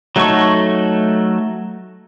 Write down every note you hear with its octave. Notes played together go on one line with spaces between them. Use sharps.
F#3 A3 D#4 A4 C#6